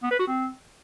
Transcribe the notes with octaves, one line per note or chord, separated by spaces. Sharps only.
B3
B4
F#4
C4